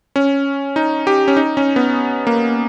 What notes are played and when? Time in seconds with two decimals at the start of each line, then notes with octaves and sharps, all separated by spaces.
0.16 C#4
0.76 D#4
1.07 G4
1.28 C#4
1.37 D#4
1.57 C#4
1.76 B3
2.27 A#3